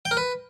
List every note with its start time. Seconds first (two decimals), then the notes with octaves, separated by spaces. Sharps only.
0.05 G5
0.11 A#4
0.17 B4